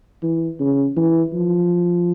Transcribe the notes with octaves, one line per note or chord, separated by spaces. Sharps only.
E3
C#3
E3
F3